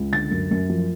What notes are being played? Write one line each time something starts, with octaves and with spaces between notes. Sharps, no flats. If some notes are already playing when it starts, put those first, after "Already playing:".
Already playing: C#2
D3 A6
F#2
F#2
F3